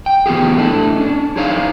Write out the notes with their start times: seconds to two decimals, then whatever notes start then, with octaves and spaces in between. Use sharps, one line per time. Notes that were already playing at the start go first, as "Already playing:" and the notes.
0.06 G5
0.26 E3 B3 F4 G4 G#4
0.57 A3 D4 E4
0.96 C#4 D4
1.36 D#4 E4 G#4 C#5 D5 F5